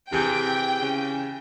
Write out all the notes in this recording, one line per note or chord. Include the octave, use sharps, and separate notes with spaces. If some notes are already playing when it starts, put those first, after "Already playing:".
C3 E3 G4 G#4 G5
C#3